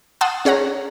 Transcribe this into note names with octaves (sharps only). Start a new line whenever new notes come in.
F#5 A5 C6 D#6 E6
C#4 G#4 C#5 F#5 A#5